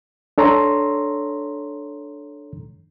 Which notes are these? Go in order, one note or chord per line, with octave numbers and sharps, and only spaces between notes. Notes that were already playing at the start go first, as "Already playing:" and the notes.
D4 A4 C#5 A#5 C6